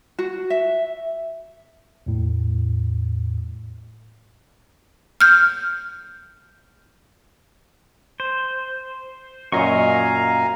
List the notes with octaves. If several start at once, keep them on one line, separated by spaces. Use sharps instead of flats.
F#4
E5
E2 A2
F6 G6
C5
F#2 A#2 D#5 F5 G#5 A#5 C#6